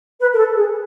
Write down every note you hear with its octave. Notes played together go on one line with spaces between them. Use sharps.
B4
A#4
A4
G#4